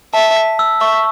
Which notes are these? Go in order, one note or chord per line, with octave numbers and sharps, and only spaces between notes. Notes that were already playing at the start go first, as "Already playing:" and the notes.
E5 A5
B6
E6
E5 C#6